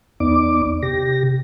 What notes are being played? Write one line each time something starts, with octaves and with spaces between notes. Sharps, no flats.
E2 B3 D#4 D5 D6
C3 G4 A#6